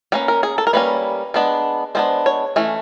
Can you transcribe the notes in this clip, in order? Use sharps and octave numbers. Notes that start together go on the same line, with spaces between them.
G3 A#3 C#4 B4
A#4
G#4
A4
A#4
G3 A#3 C#4 B4
G#3 B3 D4
G#3 B3 D4 C5
C#5
E3 A3 C#4